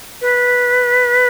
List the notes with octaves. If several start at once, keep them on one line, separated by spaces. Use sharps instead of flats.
B4